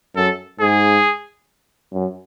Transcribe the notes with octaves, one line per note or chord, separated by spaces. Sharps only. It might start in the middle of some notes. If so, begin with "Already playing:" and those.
F#2 A4
G#2 G#4
F#2